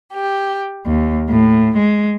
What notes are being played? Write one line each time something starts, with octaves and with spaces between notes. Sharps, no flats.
G4
D#2
A2
G#3